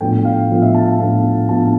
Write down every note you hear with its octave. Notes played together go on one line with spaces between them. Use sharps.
A2 F3 B3 D4 G5
F5
A2 F3 B3 D4
E5
A5
F5
A2 F3 B3 D4
A2 F3 B3 D4 A5